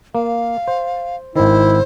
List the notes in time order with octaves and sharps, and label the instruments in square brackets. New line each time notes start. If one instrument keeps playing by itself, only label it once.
[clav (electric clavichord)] A#3 [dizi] F5
[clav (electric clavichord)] C5
[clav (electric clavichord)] G#1 D#3 [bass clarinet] E4 [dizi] C5